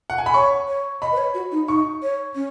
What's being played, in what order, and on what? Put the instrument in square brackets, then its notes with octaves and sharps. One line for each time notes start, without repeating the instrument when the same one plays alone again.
[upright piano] F#5
G#5
B5
[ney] C#5 [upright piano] C#6
[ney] C#5
[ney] D#5 [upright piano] B5
[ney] B4
C#5
F#4
D#4
[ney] D#4 [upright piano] C#6
[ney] C#5
C#4